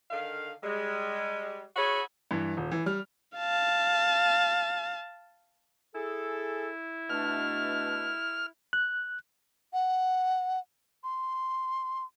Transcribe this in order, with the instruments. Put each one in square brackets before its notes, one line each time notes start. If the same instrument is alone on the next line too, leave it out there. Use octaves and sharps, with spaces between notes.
[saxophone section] D3 D#3 F5
G3 G#3
E4 F#4 G#4 C#5
[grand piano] G2 E3
D#1
E3
G3 F6
[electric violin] F5 A5
[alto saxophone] E4 [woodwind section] G#4 A4
[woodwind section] B2 A3 D4 [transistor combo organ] F6
[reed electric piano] F#6
[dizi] F#5
C6